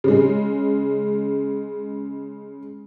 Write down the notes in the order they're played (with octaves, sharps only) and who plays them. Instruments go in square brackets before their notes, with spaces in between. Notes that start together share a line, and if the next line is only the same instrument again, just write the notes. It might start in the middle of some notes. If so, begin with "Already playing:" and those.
[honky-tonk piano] C#3 G#3